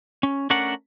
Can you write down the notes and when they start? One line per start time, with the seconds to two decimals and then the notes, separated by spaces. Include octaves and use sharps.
0.23 C#4
0.50 A3 C#4 D4 A#4 F#5